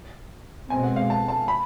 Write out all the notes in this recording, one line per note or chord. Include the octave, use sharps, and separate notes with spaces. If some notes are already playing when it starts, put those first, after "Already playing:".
B2 G#3 C4 G#5
F#5
F5
A5
A5
B5